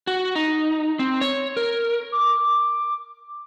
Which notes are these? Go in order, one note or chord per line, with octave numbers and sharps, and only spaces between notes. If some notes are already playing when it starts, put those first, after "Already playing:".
F#4
D#4
C4
C#5
A#4
D6